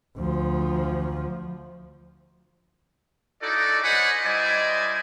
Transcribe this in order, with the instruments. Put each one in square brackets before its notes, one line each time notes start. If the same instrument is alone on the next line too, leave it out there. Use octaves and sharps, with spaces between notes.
[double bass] D2 F3
[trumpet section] D#4 E4 F#4 A4 D5
C5 C#5 D#5 F#5 G#5 B5
G3 E4 C5 D5 D#5 G#5